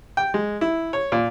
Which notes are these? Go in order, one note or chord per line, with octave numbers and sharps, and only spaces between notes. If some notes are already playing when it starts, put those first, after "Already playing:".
G5
G#3
E4
C#5
A#2